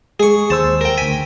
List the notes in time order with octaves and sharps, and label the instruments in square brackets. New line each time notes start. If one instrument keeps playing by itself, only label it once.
[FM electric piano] G#3 [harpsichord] G#4 C#6
[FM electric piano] D#2 C5 E6 [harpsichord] A5
[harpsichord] A#4 G5
[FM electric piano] D2 B6 [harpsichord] G#5